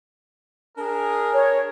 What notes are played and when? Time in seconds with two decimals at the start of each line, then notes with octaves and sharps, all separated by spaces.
0.78 D4 G#4 A#4
1.33 C#5